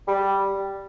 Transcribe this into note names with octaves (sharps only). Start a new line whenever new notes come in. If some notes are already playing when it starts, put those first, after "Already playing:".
G3